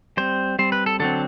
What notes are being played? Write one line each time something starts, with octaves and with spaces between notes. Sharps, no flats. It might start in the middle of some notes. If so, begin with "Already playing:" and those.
G3 C4 C5
G3 C4 C5
B4
A4
D3 F#3 C4 A4